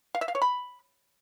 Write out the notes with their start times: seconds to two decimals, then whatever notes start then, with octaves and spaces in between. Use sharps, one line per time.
0.15 F5
0.21 E5
0.28 F5
0.35 C#5
0.42 B5